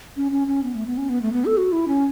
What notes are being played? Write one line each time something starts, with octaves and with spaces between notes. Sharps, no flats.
C#4
C#4
C#4
B3
A3
B3
C#4
B3
A3
B3
A4
F#4
E4
C#4